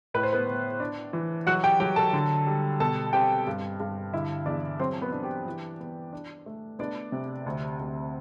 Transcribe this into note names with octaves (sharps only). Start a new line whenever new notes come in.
A2 B4
C5
B3 B4
B3
D4
E3
F#3 F#4 F#5
G4 G5
F#3 G4 G5
A4 A5
D3
G3
B2 A4 A5
C4 G4 G5
G2
G2
D3 E4 E5
E2 D4 D5
F#3 C4 C5
B3 B4
D4
G4
E3
B3
D4
A3
B3 D4 D5
C3
D2
D2